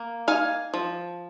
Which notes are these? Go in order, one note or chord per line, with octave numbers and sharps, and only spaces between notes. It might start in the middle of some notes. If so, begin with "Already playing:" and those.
Already playing: A#3
D#4 F5 G#5
F3